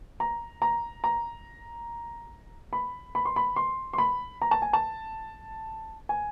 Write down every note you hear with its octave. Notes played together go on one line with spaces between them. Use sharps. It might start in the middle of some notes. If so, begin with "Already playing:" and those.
A#5
A#5
A#5
B5
B5
C6
B5
C6
C6
B5
A#5
A5
G#5
A5
G#5